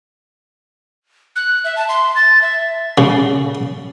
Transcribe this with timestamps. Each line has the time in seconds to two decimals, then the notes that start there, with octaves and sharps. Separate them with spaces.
1.36 F#6
1.65 E5
1.76 A5
1.89 C6
2.16 A6
2.42 E5
2.98 C#3